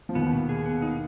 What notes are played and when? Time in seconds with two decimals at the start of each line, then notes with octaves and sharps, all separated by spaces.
0.09 F3
0.15 D#2 D#3 B3
0.33 B2
0.49 G#4
0.66 B3
0.82 D#4